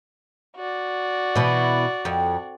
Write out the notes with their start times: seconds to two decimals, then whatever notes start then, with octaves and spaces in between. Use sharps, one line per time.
0.56 F#4 D5
1.36 B2 E3
2.05 F2